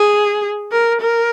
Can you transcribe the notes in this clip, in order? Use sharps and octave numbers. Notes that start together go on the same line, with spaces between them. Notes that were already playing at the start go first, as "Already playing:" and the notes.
Already playing: G#4
A#4
A#4